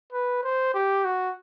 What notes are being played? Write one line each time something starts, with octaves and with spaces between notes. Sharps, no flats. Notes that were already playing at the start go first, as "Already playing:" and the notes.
B4
C5
G4
F#4